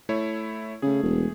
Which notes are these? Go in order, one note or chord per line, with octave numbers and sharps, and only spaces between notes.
A3 E4 C#5
C#3 A3 G#4
E1